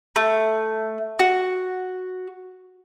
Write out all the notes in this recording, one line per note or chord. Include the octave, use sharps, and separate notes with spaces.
A3
F#4